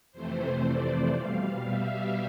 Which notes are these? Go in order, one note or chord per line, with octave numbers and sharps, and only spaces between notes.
F2 C3 E3 A3 C5
D5
B2 G3 F5
E5